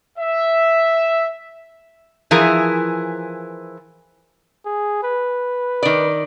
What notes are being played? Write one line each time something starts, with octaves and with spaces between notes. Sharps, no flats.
E5
E3 F3 E4 G#4 A#4
G#4
B4
D#3 D5